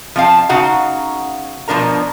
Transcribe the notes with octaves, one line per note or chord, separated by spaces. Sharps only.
F3 C4 F5 A5
C#3 D#4 F#4 F5 F#5 A#5
B2 F3 D4 A#4 A#5